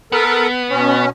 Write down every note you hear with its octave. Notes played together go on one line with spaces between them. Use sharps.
B3 A4 A#4
B2 C#4